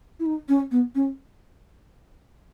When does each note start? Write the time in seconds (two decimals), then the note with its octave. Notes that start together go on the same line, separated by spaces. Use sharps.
0.20 E4
0.26 D#4
0.49 C#4
0.71 B3
0.95 C#4